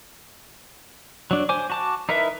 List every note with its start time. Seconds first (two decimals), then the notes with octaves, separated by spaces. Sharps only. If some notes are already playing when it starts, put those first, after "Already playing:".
1.31 F#3 D4
1.49 C5 G#5 D6
1.70 F#4 A5 D6
2.09 D#4 E4 A#4 B4 E5